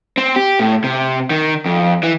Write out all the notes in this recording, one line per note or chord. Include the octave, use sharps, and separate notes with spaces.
C4
G4
A2
C3
D#3
F2
E3